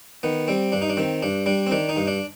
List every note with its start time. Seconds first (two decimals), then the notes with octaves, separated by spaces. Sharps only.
0.23 D#3 B3
0.48 G3 C4
0.72 G2 D4
0.82 D#4
0.89 D4
0.97 D#3 C4
1.23 G2 D4
1.46 G3 D4
1.67 C4
1.71 D#3 D4
1.89 D#4
1.96 G2
2.07 D4